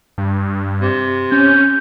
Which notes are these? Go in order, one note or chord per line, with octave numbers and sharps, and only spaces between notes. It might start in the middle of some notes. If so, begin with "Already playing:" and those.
G2
C3
C#4 G6